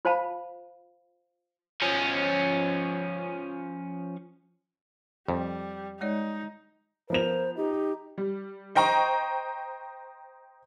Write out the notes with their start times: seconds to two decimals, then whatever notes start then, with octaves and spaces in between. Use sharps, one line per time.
0.05 F4 C5 F5 A5 B5
1.82 F3 C#4
5.28 F2 G3
6.01 G#3 D#4 C#5 D5
7.10 F3 B3 A#4 C5 F7
7.57 D#4 G4
8.18 G3
8.75 C5 D#5 G5 A#5 C#6